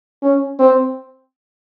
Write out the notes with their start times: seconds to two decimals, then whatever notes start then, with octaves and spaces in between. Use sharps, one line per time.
0.22 C#4
0.59 C4